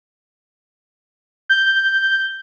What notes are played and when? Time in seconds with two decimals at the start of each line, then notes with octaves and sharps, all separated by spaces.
1.49 G6